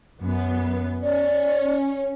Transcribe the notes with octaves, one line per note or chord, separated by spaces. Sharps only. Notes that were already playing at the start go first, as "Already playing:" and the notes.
F#2 B3
C#4 D5